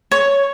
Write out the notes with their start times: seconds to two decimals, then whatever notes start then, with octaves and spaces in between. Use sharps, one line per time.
0.11 C#5